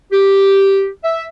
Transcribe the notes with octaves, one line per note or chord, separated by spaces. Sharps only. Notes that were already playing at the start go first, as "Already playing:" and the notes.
G4
E5